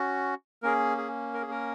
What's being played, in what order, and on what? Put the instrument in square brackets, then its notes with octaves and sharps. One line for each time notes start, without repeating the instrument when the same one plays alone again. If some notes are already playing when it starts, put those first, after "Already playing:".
Already playing: [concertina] C#4 F#4
A#3 C#4 G#4 A#4
G#4
A#4
G#4
A#4